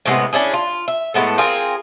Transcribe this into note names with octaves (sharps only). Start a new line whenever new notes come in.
A2 C3 G#3 B3
C#4 D4 E4 G#4
F4
E5
A2 G#3 B3 A4
C4 F4 G#4 A#4